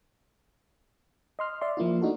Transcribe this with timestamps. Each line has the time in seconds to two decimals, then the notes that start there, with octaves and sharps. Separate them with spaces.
1.39 D#5 C6 F6
1.61 D5 E5 C6
1.77 F3 A#3 E4 F4
2.01 A3 D4 D#4 F#4 A4